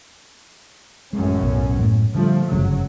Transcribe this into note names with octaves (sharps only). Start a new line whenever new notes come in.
A1 F#2 G#3 C#4
B1 B3
F#2 A2
D3 F3 G3 A3
G1 F#2 C#3 F#3